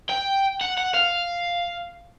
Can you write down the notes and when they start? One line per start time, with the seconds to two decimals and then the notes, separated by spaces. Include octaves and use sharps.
0.10 G5
0.61 F#5
0.77 F#5
0.94 F5